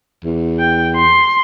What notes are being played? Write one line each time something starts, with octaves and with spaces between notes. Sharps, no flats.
E2
G5
C6